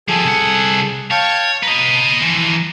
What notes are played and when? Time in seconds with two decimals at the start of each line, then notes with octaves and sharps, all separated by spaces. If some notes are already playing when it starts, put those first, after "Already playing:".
0.08 F3 G3 G#4 A4
0.24 C2 F#5
1.11 C#5 F5 G5 A5
1.63 B4 D#5 A#5
2.22 E3 F3